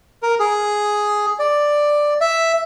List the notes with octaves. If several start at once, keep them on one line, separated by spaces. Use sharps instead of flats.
A#4
G#4
D5
E5